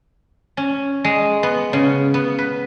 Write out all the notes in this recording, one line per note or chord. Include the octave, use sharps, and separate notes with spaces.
C#4
G#3
B3
C#3
B3
B4